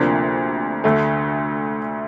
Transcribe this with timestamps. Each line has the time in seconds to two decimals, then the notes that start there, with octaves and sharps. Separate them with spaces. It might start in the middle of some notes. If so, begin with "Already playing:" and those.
Already playing: D2 C3 F3 A#3 D4
0.84 D2 D3 A3